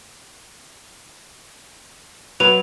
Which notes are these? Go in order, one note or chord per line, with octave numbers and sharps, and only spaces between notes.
F#3 B4 F7